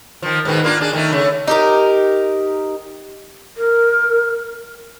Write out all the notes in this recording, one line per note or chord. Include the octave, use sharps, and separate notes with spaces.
D#3 F3
G#2 B2 D#3
A#3 D4 F4
D4 G#4
D#3 A3 D#4
C#3 A3
D#4 G4 A#4
A#4